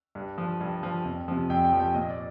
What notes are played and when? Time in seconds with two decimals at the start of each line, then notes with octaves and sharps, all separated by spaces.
0.15 G2
0.38 F3
0.61 G2
0.83 F3
1.05 F2
1.28 C3 F3
1.50 F2 G5
1.64 G5
1.73 C3 F3
1.80 G5
1.94 A#2 D#5
2.10 D5